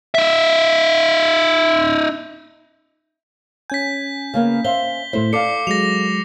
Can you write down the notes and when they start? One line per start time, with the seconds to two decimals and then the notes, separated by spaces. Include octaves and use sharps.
0.15 D#4 E5
3.70 C#4 G#5 G6 B6
4.34 C#3 A#3 B3
4.65 C5 E5 F5 G7
5.13 A2 A3 E4 C5
5.33 A4 D5 F5 D6 C7 C#7
5.67 F#3 G#3 A#6 F7